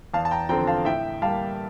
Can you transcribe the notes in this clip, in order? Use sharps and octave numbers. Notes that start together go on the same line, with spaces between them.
E2 F5 A5
A5
G5 A#5
D3 F3 C4 G5 A#5
F5 A5
A2 E5 G5
G3 A#3 F5 A5